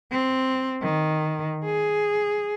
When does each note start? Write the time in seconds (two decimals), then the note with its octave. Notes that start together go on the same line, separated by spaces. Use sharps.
0.12 C4
0.82 D#3
1.65 G#4